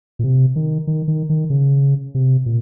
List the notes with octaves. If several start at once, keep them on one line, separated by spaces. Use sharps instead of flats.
A#2
C3
D#3
D#3
D#3
D#3
C#3
C3
A#2